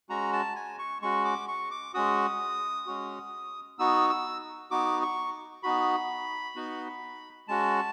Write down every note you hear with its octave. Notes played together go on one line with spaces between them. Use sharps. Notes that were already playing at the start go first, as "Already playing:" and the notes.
G#3 C#4 F#4 A#5
A5
G#5
C#6
G#3 C#4 F#4 C#6
D6
C#6
D6
G#3 C#4 F#4 D#6
G#3 C#4 F#4
B3 D#4 F#4 E6
E6
B3 D#4 F#4 D6
C#6
B3 D#4 F#4 B5
B3 D#4 F#4
G#3 C#4 F#4 A5